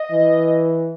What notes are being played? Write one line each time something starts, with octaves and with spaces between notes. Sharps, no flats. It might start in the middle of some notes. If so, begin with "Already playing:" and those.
Already playing: D#5
E3